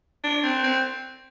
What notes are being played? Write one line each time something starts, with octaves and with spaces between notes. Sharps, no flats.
D4
C4
C4